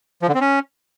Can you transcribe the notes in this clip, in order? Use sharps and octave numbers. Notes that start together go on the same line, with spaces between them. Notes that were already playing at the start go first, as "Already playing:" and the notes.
F3
D3
C4
C#4